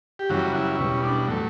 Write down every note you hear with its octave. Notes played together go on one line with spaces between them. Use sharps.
G4
F#2 C#3 E3 G3 F#4
E4
E2 B2 G3 C#4
D4
A2 F#3 A3